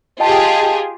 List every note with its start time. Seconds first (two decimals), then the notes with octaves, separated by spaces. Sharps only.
0.20 F4 G4 G#4 D#5 G5 A5